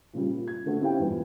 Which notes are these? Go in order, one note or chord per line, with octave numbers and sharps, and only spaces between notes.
A#2 C#3 F3 G3
A#2
G#6
D3 A3 F#4
C4 C#4 E4 G4 F5 G5
E2 G2 A#2